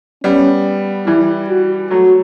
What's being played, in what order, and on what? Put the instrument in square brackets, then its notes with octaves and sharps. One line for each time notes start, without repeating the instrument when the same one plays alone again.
[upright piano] G3 B3 [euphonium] C#4
[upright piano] E3 G3 [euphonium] E4
[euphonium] F#4
[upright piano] F#3 A3 [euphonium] F#4